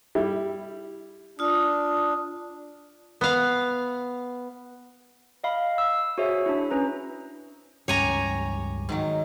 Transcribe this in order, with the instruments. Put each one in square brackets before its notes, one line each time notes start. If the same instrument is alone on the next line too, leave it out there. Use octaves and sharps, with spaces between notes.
[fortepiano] G3 E4
[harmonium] D4 [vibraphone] F4 D#6
[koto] B3 F5
[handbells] D#5 F5 B5
E6
F#4 G#4 C5 C#5 E5
D4 E4
C#4 B4 A#5
[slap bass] C#2 G2 C#4 [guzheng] G4 [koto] C#5 G#5 A#5
[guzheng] G#2 D#3 F#3